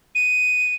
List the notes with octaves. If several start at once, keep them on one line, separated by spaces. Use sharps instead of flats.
D#7